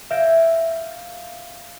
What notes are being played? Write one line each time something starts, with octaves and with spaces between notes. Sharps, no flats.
E5 F5 G6 G#6 A#6 D7